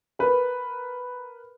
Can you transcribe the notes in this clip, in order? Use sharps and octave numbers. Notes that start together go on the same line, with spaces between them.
A#4 B4